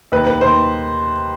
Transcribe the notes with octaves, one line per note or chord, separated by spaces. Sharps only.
D#2 B4
B4
D#2 C5